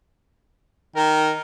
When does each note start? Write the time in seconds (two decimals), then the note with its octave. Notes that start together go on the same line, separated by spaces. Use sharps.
0.96 D#3 A#4